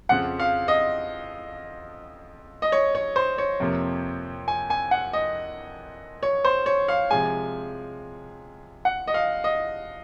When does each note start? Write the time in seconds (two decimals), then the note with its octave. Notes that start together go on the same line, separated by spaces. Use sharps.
0.09 F2 C#3 F3 F#5
0.40 F5
0.68 D#5
2.62 D#5
2.72 C#5
2.95 C#5
3.16 C5
3.38 C#5
3.60 F2 C3 F3 A#3
4.48 G#5
4.70 G#5
4.91 F#5
5.13 D#5
6.23 C#5
6.45 C5
6.66 C#5
6.88 F5
7.10 C3 F3 G#3 G#5
8.85 F#5
9.08 D#5
9.14 F5
9.44 D#5